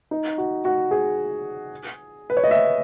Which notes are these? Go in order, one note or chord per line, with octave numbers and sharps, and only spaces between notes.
D#4
F#4
F#4
G#4
B4
C#5
D#5
E5